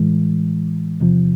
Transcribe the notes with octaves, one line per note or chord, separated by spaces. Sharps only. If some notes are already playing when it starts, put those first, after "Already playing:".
Already playing: A2 E3 G#3
E2 C3 F3